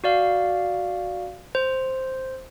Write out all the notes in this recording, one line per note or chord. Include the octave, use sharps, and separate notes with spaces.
F#4 D5 F5
C5